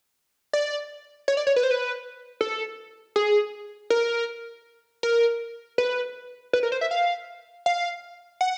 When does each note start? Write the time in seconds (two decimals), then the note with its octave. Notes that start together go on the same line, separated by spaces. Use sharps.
0.53 D5
1.28 C#5
1.37 D5
1.47 C#5
1.56 B4
1.63 C5
1.71 B4
2.41 A4
3.16 G#4
3.90 A#4
5.03 A#4
5.78 B4
6.53 B4
6.63 A#4
6.72 C5
6.81 E5
6.91 F5
7.66 F5
8.41 F#5